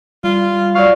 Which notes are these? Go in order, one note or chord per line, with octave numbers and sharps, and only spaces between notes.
G3 F4
F#3 D5 F5 C#6